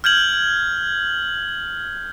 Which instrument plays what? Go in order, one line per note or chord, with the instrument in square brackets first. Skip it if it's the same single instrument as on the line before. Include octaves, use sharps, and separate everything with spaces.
[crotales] F6 G6 G#6 F#7